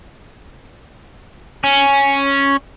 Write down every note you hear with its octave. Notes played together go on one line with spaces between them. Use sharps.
C#4